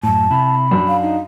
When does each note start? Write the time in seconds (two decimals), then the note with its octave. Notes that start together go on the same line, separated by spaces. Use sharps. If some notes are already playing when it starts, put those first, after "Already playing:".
0.03 F#2 A2 A5
0.31 C3 E4 B5
0.71 F#2 D4
0.88 F5
1.02 D#4